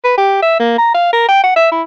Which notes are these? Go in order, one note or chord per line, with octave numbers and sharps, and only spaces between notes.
B4
G4
E5
A#3
A#5
F5
A#4
G5
F#5
E5
E4